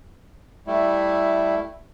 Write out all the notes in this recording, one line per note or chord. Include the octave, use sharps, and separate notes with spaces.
G3 A3 E4